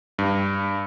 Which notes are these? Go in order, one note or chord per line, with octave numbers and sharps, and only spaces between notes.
G2